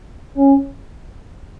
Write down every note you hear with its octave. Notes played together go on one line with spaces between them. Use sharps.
C#4